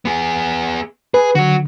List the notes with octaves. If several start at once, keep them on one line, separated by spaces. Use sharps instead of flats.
B3 G#4
G#4 B4
D3 F#3 F#4